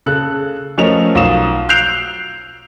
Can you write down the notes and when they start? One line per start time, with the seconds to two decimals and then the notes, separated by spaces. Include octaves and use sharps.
0.06 C#3 A4 F#6
0.78 F3 A3 C#4 A#4 D#5 F7
1.15 B1 F4 F5 D#6 E7
1.69 E6 F#6 G6 C7 D7 F7